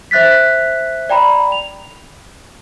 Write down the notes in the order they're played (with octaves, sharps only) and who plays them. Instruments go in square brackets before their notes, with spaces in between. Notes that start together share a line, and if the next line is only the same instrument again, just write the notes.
[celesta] C5 E5 F#6 A6 B6
D5 G5 A#5 B5
F7